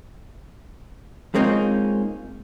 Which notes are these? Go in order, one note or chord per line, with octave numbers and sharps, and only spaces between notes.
G#3 A#3 C4 C#4 D#4 F4